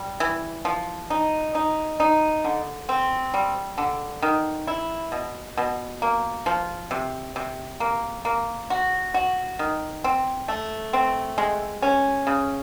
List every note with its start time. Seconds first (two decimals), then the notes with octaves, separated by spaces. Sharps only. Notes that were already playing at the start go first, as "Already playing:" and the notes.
Already playing: G3
0.20 E3
0.65 F3
1.10 D#4
1.55 D#4
2.00 D#4
2.44 D3
2.89 C4
3.34 G3
3.78 D3
4.22 D#3
4.67 E4
5.12 B2
5.57 B2
6.02 A#3
6.46 F3
6.91 C3
7.36 C3
7.80 A#3
8.25 A#3
8.70 F#4
9.14 F#4
9.59 D#3
10.04 C4
10.48 A3
10.93 C4
11.38 G#3
11.82 C#4
12.27 C#3